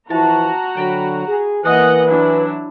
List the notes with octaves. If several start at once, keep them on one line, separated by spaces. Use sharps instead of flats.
E3 F3 E4 F#4 A5 A#5
D3 F#3 G5 A5 B5
G#4
E3 A#3 B4 D#5 F#5 G#5 D#6
F#3 D4 E4